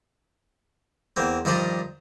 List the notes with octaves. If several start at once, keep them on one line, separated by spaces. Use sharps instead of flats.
E2 A#3 C4
G2 D#3 F3 F4 D5 D#5